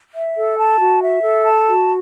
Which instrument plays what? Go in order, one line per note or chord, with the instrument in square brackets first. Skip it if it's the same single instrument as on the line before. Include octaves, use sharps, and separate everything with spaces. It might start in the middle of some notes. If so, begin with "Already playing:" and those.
[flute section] E5
A4
A5
F#4
E5
A4
A5
F#4